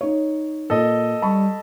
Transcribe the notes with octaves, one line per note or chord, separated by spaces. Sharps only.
D#4 C#5
A#2 A4 D#5
G3 A5 B5 C#6